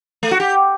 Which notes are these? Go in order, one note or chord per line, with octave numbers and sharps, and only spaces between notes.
A3
F#4
G4